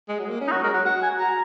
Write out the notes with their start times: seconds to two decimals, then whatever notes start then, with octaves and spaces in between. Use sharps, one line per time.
0.09 G#3
0.19 F#3
0.25 G#3
0.29 A#3
0.41 C#4
0.48 D#4
0.52 F#3 F#4
0.63 G#3 A#4
0.74 F#3 F#5
0.86 F#4 F#5
1.03 G#5
1.19 F#4 A#5